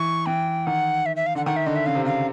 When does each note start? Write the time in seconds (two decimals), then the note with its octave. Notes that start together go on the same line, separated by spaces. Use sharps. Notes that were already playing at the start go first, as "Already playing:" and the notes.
Already playing: E3 C#6
0.26 E3 G5
0.66 D#3 F#5
1.06 E5
1.16 E5
1.26 F5
1.35 D3 F#5
1.46 D#3 F#5
1.56 E5
1.66 D3 D#5
1.76 E5
1.86 C#3 F5
1.95 C3
2.05 C#3 F5